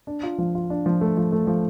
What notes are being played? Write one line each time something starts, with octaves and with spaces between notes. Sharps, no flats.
D4
F4
F3
F4
D4
F3
A3
F3
A3
F3